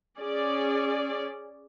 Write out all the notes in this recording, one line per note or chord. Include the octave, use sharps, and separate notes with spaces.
C#4 G#4 D5